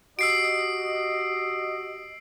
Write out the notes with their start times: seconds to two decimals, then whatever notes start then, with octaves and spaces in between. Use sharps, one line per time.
0.19 F#4 G4 D#5 E6 C7 D7